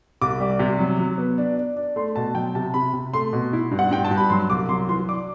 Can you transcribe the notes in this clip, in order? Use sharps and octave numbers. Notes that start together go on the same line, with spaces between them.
C2 D6
G3
C3
F#3
F#3
B3
D4
D4
D4
A3 C6
B2 A5
F#3 G5
C3 A5
C3 B5
C3
A3 C6
B2
E4
G2
F#5
G2 G5
A5
G2
B5
F#3 C6
C2 D6
F#3 C6
E3 C6
D4 D6